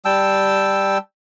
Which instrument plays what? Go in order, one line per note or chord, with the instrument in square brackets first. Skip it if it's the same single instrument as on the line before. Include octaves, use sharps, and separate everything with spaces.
[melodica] G3 G5 A5 E6